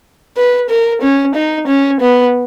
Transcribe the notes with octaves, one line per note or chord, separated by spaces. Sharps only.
B4
A#4
C#4
D#4
C#4
B3